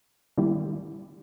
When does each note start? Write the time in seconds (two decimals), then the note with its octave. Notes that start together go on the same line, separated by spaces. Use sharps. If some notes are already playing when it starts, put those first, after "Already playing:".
0.38 D#3 G3 A#3 E4 G4